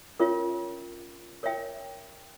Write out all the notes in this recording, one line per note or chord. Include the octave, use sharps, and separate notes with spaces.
C#4 F4 A#4 C#5 E5
A#4 C#5 E5 G5